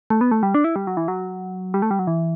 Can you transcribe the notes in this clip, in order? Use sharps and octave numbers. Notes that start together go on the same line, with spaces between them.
A3
B3
A3
G3
D4
E4
G3
F#3
E3
F#3
G3
A3
G3
F#3
E3